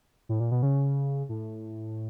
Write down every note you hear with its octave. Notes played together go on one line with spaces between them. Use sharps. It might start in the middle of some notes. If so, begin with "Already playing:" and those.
A2
A#2
B2
C#3
A2